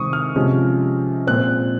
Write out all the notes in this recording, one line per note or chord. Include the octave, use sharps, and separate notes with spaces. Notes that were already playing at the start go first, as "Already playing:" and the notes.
Already playing: C3 D#3 G#3 C4 C#6 D#6
F6
C3 F3 G#3 C#4
A#2 G#3 C4 F#6